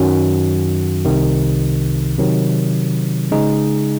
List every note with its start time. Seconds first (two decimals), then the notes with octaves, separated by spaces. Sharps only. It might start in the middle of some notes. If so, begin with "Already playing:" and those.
Already playing: F#2 D#3 F#3 C#4 F#4
1.05 C2 C3 D#3
2.18 C3 D#3 F#3
3.31 C#3 G#3 D#4 G#4